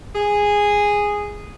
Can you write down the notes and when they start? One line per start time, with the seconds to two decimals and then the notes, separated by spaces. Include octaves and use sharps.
0.16 G#4